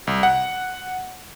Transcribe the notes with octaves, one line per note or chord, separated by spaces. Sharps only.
C2
F#5